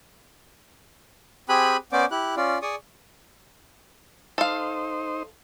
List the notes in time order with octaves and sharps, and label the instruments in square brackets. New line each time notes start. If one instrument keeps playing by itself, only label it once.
[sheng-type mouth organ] C4 G4 G#4 G#5 B5 F#6
B3 C#4 C5 D5 D6
E4 G4 F#6
C#4 F4 D5
G#4 D5 C#6 D#6
[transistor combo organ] D#4 C5 [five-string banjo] A4 F5